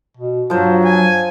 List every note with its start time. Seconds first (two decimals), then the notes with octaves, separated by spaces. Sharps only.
0.17 B2
0.50 G2 F3 F#3 C5
0.85 G#5